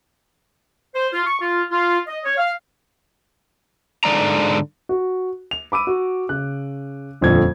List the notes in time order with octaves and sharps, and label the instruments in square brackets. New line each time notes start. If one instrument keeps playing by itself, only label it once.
[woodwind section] C5
F4
C#6
F4
F4
D#5
C#5
F5
[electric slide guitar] G#2 D3 G#3 D5 A#5
[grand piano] F#4
F7
B5 D6 E6 D#7
F#4
C#3 F#6
D#1 F2 D3 G#6